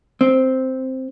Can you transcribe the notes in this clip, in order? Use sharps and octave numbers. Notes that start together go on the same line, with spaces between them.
C4